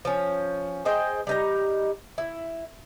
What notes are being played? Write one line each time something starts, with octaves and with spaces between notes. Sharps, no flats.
F3 C#4
G#4 C5 D#5 G5
G3 D#4 A#5
E4